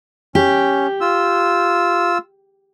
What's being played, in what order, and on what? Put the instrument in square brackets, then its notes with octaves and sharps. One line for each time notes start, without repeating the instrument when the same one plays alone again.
[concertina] C#4 [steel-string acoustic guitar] G4
[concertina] F4 E6